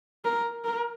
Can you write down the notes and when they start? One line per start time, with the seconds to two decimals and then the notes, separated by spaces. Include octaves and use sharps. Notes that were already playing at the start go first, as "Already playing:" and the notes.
0.25 A#4
0.64 A#4